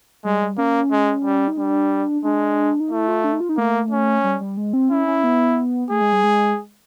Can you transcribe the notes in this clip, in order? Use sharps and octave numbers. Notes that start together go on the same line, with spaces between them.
G3 G#3
G3
A#3 C#4
G#3
G3
D#4
G3 D4
G#3 D4
D#4
A3 E4
F4
D4
D#4
F4
D#4
A3 A#3
C#4
G3
G3
G#3
C4
C#4 E4
C#4
B3
A3 G#4
G#3
G3
G#3